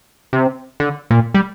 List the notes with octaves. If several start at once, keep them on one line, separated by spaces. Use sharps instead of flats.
C3
D3
A#2
G3